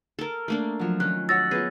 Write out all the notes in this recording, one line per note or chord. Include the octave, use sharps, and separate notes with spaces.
A4 A#4
A3 A#3 D4
F3 F#3
D#3 C#4 F#6
F#4 C#5 F#5 E6 A6 A#6
B3 F4 G#4